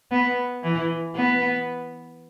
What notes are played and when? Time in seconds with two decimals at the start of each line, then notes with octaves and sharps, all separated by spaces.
0.11 B3
0.63 E3
1.15 B3